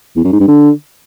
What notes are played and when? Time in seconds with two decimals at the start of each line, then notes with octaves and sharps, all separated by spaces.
0.16 E2
0.24 F#2
0.32 G#2
0.40 G2
0.48 D3